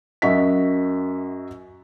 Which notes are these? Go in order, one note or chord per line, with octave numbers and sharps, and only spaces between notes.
F#2 F#4 D#5 E5 B6